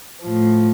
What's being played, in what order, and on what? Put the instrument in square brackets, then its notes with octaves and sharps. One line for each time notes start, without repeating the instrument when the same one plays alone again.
[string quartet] A2 F3